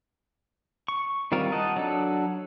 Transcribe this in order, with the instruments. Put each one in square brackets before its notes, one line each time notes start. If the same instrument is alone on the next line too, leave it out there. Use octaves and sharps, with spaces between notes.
[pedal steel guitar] C#6
D#3 G3 C4 F4 A#4
D#4 D#5 F#5 A5
F#3 D4 A4